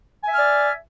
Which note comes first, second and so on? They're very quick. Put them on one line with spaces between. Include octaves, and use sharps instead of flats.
G#5 E5 F6 D5